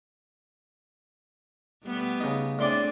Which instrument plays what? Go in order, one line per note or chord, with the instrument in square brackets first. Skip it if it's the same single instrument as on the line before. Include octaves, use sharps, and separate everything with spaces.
[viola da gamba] G3 A3 B3
[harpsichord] C#3 D#4
[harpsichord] A2 C6 D6 [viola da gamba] C4 D4 G#4 [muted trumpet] D5